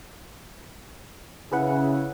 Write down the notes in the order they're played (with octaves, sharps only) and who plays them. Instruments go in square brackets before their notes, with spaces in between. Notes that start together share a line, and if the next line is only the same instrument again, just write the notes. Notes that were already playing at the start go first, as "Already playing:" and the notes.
[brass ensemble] C#3 [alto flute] E4 [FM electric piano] G#4 B4 F#5